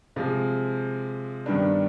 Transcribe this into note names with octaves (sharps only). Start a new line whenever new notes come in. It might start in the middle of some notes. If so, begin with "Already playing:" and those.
C3 F3 G#3
G2 D#3 G3 B3 D4